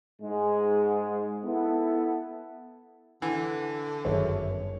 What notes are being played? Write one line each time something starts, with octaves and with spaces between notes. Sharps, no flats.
G#2 G#3
B3 E4 A4
D3 E3 F#5
G1 F#2 D#3 G#4 C#5 E5